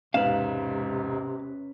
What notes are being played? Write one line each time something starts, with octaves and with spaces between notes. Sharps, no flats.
E1 G#2 C3 C#4 B4 F5 E7